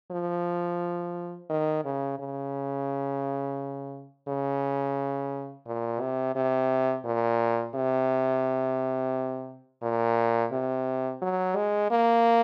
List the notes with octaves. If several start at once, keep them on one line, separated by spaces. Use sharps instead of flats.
F3
D#3
C#3
C#3
C#3
A#2
C3
C3
A#2
C3
A#2
C3
F#3
G#3
A#3